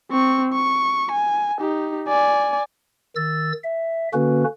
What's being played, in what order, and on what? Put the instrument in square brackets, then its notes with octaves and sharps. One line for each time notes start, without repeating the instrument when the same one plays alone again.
[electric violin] C4 C#6
C#6
G#5
D#4 G4
D5 G#5
[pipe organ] D#3 E6 A6
E5
D3 A#3 C#4 F#4 B4